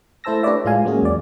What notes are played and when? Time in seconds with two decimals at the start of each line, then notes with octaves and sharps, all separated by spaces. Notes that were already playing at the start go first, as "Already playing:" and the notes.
0.24 A3 E4 C5 A5 E6 A#6
0.43 D4 G4 B4 C#5 D5 E5
0.65 A2 G#3 F4 F5 G#5
0.85 F#3 G#3 A#3 C#4 F#4 G#4
1.02 E2 D5